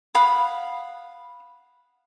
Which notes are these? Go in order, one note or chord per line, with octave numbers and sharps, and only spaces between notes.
F5 F#5 B5 D#6